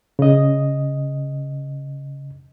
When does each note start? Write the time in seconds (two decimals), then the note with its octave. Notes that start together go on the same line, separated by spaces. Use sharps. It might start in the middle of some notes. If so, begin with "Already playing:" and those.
0.19 C#3 D#5